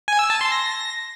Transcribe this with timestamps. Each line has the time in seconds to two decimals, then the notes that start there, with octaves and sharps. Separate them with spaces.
0.08 G#5
0.19 E6
0.30 A5
0.41 C6
0.52 A#6